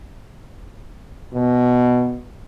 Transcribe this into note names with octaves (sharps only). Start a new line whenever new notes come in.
B2